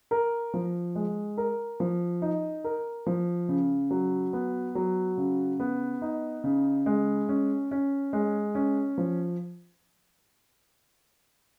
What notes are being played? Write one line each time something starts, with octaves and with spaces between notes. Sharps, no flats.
A#4
F3
G#3
A#4
F3
D#4
A#4
F3
C#3
F#3
B3
F#3
C#3
B3
D#4
C#3
G#3
C#4
C#4
G#3
C#4
F3